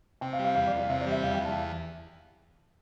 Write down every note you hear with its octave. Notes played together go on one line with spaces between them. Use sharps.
C3 G5
F5
G3
F5
E2 F5
D5
E2
D5
C3 E5
D5
G3
E5
E2 F5
G5
E2
A5